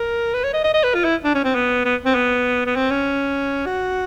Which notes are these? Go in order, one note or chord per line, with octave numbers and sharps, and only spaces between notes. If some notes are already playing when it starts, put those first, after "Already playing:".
Already playing: A#4
B4
C#5
D#5
D#5
D#5
B4
F4
E4
D4
C#4
C4
B3
B3
C4
B3
B3
C4
C#4
F#4